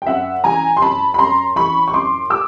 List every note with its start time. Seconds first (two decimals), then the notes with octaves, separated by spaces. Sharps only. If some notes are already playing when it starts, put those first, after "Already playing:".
0.02 G5
0.07 F#2 E5 F#5
0.44 E3 G#5 A#5
0.77 C6
0.82 F#2 A5 B5
1.14 B5
1.19 F#2 A#5 C6
1.56 E3 B5 C#6
1.88 C#6
1.94 F#2 C6 D6
2.30 D6 E6